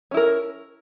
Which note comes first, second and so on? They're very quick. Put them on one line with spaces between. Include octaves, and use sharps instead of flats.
C#4 E4 A#4